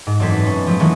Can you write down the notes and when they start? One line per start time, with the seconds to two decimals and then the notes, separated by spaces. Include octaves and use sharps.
0.07 G#2
0.20 E1 F#2 C4 A4 G#6 B6
0.32 B4
0.46 C#4
0.67 F3 G#3 A3
0.80 D#3 E3 F#3 G#3 A#3 C#4